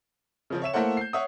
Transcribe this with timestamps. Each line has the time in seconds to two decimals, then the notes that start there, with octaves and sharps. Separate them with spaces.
0.50 C#3 F3 C4
0.62 C#5 E5 E7
0.73 A3 A#3 E4 A4 C5 F#5
0.97 G6 C7
1.13 C#5 E5 F#5 D#6